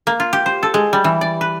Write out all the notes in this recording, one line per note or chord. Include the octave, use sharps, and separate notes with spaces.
A#3
F4
G4
C5
A4
G#3
G3
E3
D5
B4